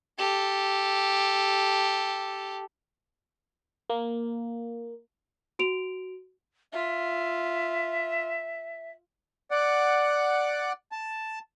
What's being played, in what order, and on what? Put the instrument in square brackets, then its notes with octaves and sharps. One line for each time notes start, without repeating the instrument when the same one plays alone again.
[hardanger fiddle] G4 A4
[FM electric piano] A#3
[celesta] F#4 D7 F7
[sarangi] F4 [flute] E5
[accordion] D5 F#5
A5